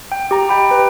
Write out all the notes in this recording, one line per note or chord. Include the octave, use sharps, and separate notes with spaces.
G5
G4 A#5
D#5 G5 B5
B4